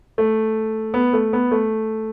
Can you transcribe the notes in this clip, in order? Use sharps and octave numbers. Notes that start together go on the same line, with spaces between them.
A3
B3
A3
B3
A3